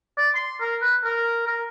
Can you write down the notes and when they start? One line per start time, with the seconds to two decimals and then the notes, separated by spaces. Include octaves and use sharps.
0.17 D5
0.35 C6
0.61 A#4
0.82 B4
1.04 A#4
1.47 A#4